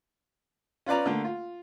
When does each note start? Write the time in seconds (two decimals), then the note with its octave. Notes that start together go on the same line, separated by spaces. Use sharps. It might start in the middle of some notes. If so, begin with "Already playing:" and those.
0.86 C#4 F4 B4 D5 A#5
1.06 D3 A3 A#3
1.25 F4